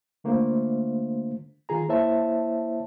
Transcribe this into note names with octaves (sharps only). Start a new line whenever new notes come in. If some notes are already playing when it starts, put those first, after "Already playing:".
D3 A3 A#3 D4 F4 C5
D#3 F4 G#4 A#5
A#3 E4 C5 C#5 E5 A5